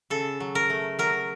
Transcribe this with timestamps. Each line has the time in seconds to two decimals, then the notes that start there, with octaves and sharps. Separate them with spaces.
0.10 C#3 A4
0.40 F#3
0.55 A#4
0.70 A3
0.99 F#3 A#4